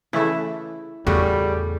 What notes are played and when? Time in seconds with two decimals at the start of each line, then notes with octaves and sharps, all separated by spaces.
0.13 C#3 E3 A3 E4 E5
1.07 E2 A2 C#3 G3 F#4 G#4